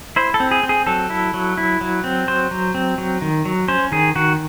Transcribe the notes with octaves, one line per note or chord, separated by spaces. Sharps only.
E4 C5
A4
C4
G#4
C4
G#4
F#3 A4
E4
F#3
E4
F#3
C4
F#3 C5
F#3
C4
F#3
D#3
F#3
C#4 C5
D#3 G#4
D#3 F#4